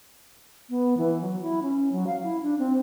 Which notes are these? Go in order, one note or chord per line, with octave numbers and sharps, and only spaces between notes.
B3
E3
F#3
E4
C#4
F#3
F5
E4
D4
C4